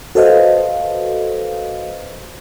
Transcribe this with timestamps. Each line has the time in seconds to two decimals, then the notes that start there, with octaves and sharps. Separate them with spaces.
0.15 F#4 A4 B4 C5 D#5 F5